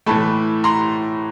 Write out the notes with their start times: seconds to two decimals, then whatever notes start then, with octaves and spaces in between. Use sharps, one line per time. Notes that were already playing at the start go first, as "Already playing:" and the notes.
0.06 A2 E3 A3 A5 B5
0.64 A#5 C6